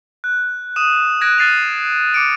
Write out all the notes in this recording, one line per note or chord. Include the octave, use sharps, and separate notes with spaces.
F#6
D#6 D#7 E7
F#6 G#6 A#6 D7
F6 F#6 A6 C7 D#7 F7
D6 C#7 D7